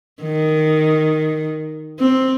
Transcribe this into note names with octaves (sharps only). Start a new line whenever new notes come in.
D#3
C4